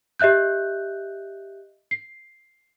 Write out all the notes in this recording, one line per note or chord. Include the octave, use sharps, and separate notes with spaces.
G4 D#5 E5 F#6 G6
C7